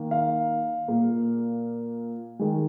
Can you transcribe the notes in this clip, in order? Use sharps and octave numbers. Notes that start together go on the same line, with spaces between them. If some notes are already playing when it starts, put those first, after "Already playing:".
Already playing: D#3 A#3
F5
A#2 A#3
D#3 G#3